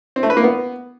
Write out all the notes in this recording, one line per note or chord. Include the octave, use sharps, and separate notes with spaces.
C4
A3
B4
A#3
B3